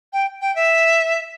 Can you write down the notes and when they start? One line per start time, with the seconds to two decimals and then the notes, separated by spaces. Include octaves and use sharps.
0.13 G5
0.41 G5
0.55 E5